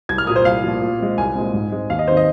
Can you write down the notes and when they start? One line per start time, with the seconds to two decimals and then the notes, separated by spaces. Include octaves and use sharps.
0.09 C2 G#6
0.18 F6
0.27 A#2 A#3 D#6
0.36 C5
0.45 C2 F5
0.63 A#2 F3
0.81 A#2
0.99 G#3 C4
1.18 C2 G#5
1.35 A#2 G#3 C4
1.54 G#2
1.72 G#3 C4
1.90 D#2 F5
1.99 D#5
2.08 D#3 C4 C5
2.17 D#5